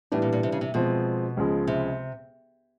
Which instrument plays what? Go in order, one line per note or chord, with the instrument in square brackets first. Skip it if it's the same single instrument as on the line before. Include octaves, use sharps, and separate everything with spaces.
[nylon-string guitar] A2 [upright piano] E3 G3 B3 D4
[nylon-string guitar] A#2
A#2
C3
C#3
C3
[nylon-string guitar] B2 [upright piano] F3 G#3 C4
[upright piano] C#2 C#3 F3 G#3
[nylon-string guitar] C3